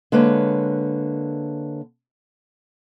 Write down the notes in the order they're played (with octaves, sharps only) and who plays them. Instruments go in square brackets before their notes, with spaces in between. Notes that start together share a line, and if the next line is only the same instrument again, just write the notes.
[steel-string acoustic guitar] D3 G#3 A#3 B4 C#5